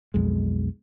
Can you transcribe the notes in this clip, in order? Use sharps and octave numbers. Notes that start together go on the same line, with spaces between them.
B1 F2 G#3